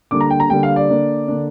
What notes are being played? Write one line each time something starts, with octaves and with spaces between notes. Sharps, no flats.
D3 G3 A#3 D4 D6
A#5
G5
A#5
D3 G3 A#3 D4 G5
F5
D5
D3 A#3 D4
D3 A#3 D4